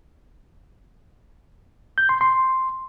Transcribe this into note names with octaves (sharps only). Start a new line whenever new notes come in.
G6
C6
C6